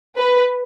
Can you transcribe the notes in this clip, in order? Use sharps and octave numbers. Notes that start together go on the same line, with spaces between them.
B4